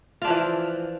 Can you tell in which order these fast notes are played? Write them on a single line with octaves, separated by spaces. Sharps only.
F4 D4 F3 E3